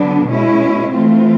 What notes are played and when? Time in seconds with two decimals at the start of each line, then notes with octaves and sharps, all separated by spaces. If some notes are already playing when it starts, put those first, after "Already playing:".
Already playing: D3 F#3 B3 D4
0.28 B2 G#3 C#4 E4
0.94 E3 A3 C4 F4